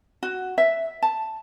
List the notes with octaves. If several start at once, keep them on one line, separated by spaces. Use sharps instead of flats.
F#4
E5
A5